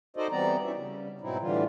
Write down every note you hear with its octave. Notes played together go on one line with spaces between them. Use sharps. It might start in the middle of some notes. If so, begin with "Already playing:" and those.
D#4 F#4 A4 C5 D5 D#5
E3 G3 B3 C4 D5 A#5
C#4 D#4 E4 F#4 E5
C#3 G3
G#2 B2 F#3 C4 D#4 E4
A2 D3 E3 G3 F4